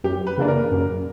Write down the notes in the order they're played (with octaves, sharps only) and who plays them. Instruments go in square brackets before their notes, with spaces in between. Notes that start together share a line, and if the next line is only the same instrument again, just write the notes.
[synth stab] F#2 [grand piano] G4
[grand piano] B4
[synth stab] C#3 E3 A#3 D4
[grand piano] A#4
[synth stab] F#2